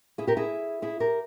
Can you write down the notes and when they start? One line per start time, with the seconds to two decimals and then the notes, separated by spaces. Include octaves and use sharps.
0.18 E4 G#4
0.27 G4 A#4
0.37 E4 G#4
0.82 E4 G#4
1.00 G4 A#4